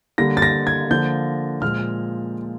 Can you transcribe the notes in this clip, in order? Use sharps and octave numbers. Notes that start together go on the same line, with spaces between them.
D3 G3 A#3 A#6
A6
A#6
G#6
D3 F3 A#3 G6
A#2 F3 G#3 F6